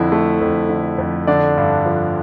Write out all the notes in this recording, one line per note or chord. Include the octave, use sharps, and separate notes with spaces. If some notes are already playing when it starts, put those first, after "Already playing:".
Already playing: F2 D3 E4
A3
F2
D3
F2
D3 D4 D5
G2
F3